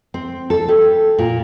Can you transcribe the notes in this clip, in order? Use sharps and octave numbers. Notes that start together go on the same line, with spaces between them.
C4
A4
G3
A#2